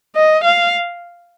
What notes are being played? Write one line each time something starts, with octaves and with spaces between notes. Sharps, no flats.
D#5
F5